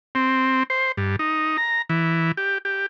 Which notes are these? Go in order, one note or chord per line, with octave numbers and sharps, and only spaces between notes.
C4
C5
G2
D#4
A#5
E3
G4
G4